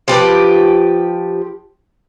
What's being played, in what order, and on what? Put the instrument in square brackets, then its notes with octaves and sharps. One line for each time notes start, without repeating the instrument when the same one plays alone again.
[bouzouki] F3 G4 B4